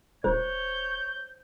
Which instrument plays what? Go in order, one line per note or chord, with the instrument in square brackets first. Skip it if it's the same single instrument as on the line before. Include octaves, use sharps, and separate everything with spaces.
[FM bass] D#1 [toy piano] C5 [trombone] C#5 [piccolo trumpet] G6